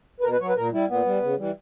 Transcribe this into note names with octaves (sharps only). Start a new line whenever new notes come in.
B4
B2 A#4
B4
F#3 C#5
B4
A#2 A#4
G3 E4
A#2 B3
G3
C#3
E3 G3